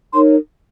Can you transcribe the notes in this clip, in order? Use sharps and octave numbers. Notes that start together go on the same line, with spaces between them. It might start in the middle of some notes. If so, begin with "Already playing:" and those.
D#4 A#4 C#5 C6